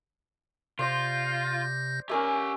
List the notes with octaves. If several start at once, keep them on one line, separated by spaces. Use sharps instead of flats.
C3 F4 C5 D5 G6 A#6
C#4 G4 A#4 E5 G#5